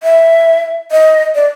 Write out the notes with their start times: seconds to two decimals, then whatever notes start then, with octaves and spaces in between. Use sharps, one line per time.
0.03 E5
0.92 D#5
1.35 D5